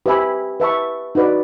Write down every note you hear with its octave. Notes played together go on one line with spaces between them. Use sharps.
G4 B4 E5 G#5 B5
B4 E5 A5 C#6
D#4 F#4 B4 D5